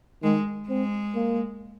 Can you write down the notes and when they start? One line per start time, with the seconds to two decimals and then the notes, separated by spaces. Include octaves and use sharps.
0.23 D#3 G#3
0.69 G#3 C4
1.15 A#3